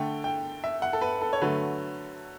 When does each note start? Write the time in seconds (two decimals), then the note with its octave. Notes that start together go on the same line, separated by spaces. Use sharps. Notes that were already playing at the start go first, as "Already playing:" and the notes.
Already playing: D3 A3 G5
0.24 G5
0.64 E5
0.82 F#5
0.93 A4
1.01 B4
1.21 A4
1.33 C#5
1.41 D3 F#3 A3 B4